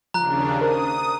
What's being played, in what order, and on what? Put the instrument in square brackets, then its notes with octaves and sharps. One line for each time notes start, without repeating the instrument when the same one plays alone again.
[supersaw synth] D#2 C#3 D4 [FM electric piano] F3 [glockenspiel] A#5 F#6
[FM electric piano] A#4 C5 [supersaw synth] D#6